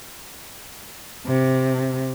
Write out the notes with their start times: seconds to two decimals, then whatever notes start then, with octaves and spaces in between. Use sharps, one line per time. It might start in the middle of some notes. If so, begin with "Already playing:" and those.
1.25 C3